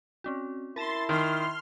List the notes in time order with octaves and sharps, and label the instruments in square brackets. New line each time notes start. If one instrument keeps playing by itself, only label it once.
[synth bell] C4 C#4 F#4
[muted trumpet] E4 [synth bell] A#4 A5 E7 [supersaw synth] C6 A6
[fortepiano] D#3 [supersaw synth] C6 F6